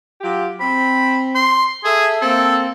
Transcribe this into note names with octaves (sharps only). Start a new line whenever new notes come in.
F#3 F4 G4
C4 B5
C6
G#4 A4 E5
A#3 C4 A4